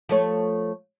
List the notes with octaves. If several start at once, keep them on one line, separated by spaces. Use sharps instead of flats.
F3 A3 C#5